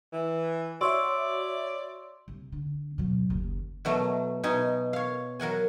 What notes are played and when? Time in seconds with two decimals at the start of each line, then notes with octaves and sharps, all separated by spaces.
0.13 E3
0.81 F#4 C#5 D5 E5 C6 C#6 E6
2.28 C2
2.52 D3
2.98 B2 F#3
3.30 F#1 D#2
3.85 B2 F#3 A3
4.43 B2 D#4 G#5
4.93 C#5 F5
5.40 F#3 A#4 F#5 G#5